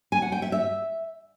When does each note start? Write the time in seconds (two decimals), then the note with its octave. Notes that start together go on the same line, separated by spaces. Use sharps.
0.12 G#5
0.22 F#5
0.32 G5
0.42 E5
0.52 E5